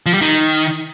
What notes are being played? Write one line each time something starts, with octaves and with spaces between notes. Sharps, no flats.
F3
G3
D#3